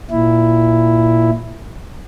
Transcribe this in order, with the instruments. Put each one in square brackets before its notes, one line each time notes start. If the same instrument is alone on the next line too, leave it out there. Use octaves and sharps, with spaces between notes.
[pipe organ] A#2 E4